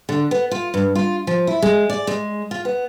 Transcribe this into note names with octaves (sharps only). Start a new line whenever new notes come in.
D3
B3
F4
G2
F4
F3
E4
G#3
D5
G#3
F4
B3